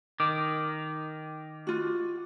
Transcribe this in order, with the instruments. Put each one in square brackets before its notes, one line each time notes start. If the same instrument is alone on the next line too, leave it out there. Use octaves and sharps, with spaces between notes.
[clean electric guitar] D#3 [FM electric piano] D6
[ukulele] F4 F#4